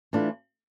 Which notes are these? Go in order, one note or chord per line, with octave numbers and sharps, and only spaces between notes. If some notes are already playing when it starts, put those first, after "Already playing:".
E3 A3 D4 F4